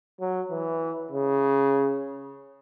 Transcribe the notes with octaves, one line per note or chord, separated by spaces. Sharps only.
F#3
E3
C#3